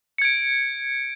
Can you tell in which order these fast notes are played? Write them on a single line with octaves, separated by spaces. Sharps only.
C#7 G#6 D7